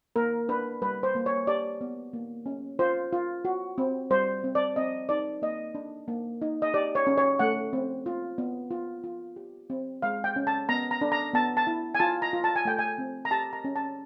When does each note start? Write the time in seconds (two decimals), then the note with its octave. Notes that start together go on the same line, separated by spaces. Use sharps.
0.16 A#3 A#4
0.49 D4 B4
0.82 G3 B4
1.03 C5
1.15 A#3
1.26 C#5
1.47 G4 D5
1.81 B3
2.13 A#3
2.46 C#4
2.79 F4 C5
3.13 F4
3.45 F#4
3.78 C4
4.10 G3 C5
4.44 C4
4.55 D5
4.76 C4 D#5
5.09 D#4 D5
5.42 A#3 D#5
5.75 D4
6.08 A#3
6.42 D#4
6.62 D#5
6.74 G4 D5
6.95 C#5
7.07 C#4
7.18 C#5
7.39 A3 F#5
7.73 C4
8.06 F4
8.38 B3
8.71 F4
9.04 F4
9.36 G4
9.70 C4
10.02 G#3 F5
10.24 G5
10.36 C#4
10.47 A5
10.69 B3 A#5
10.91 A#5
11.01 D4
11.12 A#5
11.34 B3 A5
11.57 A5
11.67 E4
11.95 G#5
11.99 F4 A5
12.22 A#5
12.33 F4
12.44 A5
12.56 G#5
12.65 A3 G5
12.79 G#5
12.98 C4
13.25 A#5
13.31 G4 A5
13.53 A#5
13.65 C#4
13.76 A5